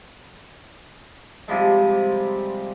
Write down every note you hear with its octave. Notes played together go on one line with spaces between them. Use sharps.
C3 F3 G3 G#3